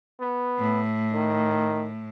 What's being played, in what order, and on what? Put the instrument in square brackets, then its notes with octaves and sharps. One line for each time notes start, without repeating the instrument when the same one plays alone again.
[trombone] B3
[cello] A2
[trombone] D#3